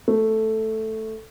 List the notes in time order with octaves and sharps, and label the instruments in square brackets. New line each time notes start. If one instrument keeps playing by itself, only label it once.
[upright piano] A3